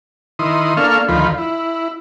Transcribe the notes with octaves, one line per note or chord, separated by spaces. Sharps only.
D#3 E4 C6 D#6
A#3 D4 A4 F5 C#6 F6
D2 D#3 F3 F4 B5
E4